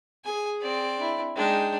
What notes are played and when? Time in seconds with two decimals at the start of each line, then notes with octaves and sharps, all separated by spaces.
0.25 G#4 G#5
0.61 C4 D5
0.96 D4 E4
1.36 G#3 D4 D#4 G5